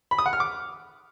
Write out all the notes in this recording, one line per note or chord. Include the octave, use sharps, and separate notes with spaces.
B5
D#6
F#5
F6
D6